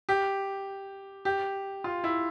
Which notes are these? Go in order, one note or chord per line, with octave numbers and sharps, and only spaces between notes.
G4
G4
F4
E4